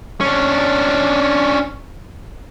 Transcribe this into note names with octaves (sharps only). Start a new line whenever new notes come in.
C#4 D4